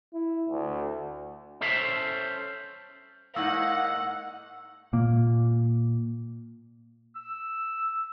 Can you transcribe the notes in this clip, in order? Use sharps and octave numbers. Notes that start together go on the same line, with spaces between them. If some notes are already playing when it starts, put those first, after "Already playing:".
E4
D2
C#4 A4 C5 E5
G#2 A#3 D#4 F#5 E6
A#2 A#3
E6